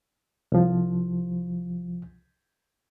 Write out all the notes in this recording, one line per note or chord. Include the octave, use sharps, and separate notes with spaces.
C2 F3